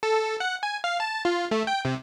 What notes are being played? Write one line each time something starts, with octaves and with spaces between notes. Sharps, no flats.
A4
F#5
G#5
F5
A5
F4
A3
G5
C3